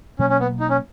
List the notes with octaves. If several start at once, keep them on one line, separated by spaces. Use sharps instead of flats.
B2 F#3 A#3 C#4
C#4
B3
D#4
C#4